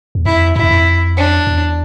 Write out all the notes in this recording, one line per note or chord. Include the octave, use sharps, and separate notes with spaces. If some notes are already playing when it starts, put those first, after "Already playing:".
E2
F2 E4
G2 E4
E2
F2
D4
E2